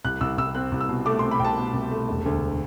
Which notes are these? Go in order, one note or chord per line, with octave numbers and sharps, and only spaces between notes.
C2 F#6
C2 E6
C2 E6
C4 F#6
C2
E6
B2
A3 D6
C4 C6
B5
C2 G5 A5
B2
C2
A3
E1
D2